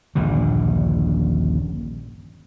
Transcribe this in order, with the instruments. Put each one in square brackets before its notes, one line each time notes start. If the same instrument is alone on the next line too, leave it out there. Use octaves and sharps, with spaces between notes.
[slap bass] D#1 A#1 G2 D3